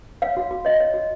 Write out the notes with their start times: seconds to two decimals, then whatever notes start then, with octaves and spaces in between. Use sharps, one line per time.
0.22 C#5 F5
0.37 F#4
0.51 F#4
0.65 C#5 D#5
0.80 C#5
0.94 F#4